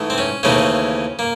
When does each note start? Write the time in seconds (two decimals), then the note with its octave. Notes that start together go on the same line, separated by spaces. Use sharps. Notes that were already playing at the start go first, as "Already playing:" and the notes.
Already playing: G#2 E3 A3
0.10 C4
0.18 C#4
0.43 D#2 C#3 E3 A3 C4 C#4
1.19 A#3